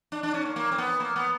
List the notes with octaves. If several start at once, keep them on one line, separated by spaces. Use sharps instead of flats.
D4
D4
C#4
A#3
A#3
C4
B3
A#3
B3